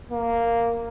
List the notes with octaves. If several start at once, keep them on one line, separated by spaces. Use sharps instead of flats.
A#3